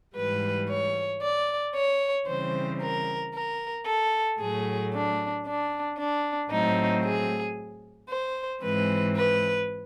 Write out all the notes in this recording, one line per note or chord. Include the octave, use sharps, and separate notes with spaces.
G#2 E3 G3 B4
C#5
D5
C#5
C#3 E3 G3 C4 C5
A#4
A#4
A4
A2 F#3 A3 G#4
D4
D4
D4
A2 F#3 A3 C4 D#4
G#4
C5
G#2 E3 G#3 C4 B4
B4